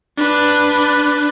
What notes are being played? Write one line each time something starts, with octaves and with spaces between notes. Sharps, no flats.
D4 B4